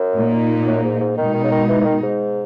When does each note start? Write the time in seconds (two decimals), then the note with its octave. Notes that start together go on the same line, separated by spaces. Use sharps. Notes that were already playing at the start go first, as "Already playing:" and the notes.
Already playing: F#2
0.15 A#2 A#3 D#4
0.66 F#2
0.83 G#2
1.00 G#2
1.17 B2 D#3 G#3 D#4
1.33 D#3
1.43 C#3
1.51 D#3
1.69 E3
1.80 E3
1.84 D#3
2.03 G#2